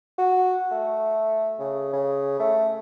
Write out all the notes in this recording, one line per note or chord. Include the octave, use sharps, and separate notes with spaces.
F#4
A3
C#3
C#3
A3